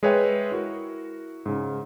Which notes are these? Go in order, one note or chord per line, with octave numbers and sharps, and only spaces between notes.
G#3 G#4 B4 C#5 E5 G5
E4 F#4 A#4
G#2 C#3